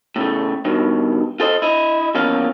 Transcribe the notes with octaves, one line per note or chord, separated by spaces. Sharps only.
A2 C#3 A3
G2 B2 D#3
F4 A4 C5 D#5
E4 D#5
E2 F3 A#3 C#4 F5